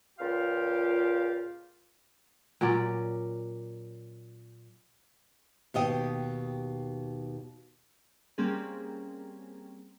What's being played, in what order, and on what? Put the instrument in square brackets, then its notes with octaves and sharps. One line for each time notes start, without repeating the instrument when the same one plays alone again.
[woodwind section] C#2 A#2 F4 G4 F5
[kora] A#2 F#3 C#4 D5
[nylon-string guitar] D#2 B2 D#5 G5
[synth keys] G3 A#3 C4 C#4 G#4